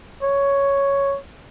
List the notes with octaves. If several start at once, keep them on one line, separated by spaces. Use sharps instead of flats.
C#5